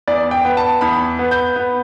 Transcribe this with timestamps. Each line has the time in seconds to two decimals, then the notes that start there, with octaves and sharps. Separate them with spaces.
0.08 E2 D5
0.31 G5
0.45 B3
0.57 A5
0.81 E2 B5
1.19 B3
1.31 G6
1.56 B3